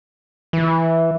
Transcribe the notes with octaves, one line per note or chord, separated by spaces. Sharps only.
E3